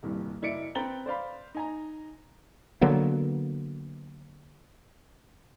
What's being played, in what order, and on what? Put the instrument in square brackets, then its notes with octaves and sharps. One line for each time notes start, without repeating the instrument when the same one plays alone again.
[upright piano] D#1 C2 G2
F#1 E4 D5 C#7 D7
C4 B4 G5 A#5 A6 G7
C5 D5 F5 B5
D#4 G#5 A#5
[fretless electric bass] D3 F#3 A#3 B3